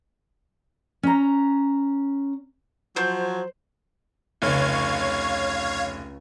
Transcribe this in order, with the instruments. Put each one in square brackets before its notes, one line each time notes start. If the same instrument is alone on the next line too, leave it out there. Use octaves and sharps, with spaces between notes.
[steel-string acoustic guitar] C#4 A#5
[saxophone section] F3 F#3 [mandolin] C5 G6
[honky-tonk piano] F1 [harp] C#2 C#6 [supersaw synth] C#5 F5 G#6